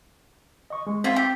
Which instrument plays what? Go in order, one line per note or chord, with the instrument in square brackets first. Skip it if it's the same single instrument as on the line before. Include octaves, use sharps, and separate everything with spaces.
[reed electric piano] D#5 C#6
G#3
[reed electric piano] C4 [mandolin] F4 E5
[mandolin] G4